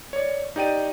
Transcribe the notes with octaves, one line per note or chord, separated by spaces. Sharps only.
C#5 D5
D#4 G4 D5 G5 D#7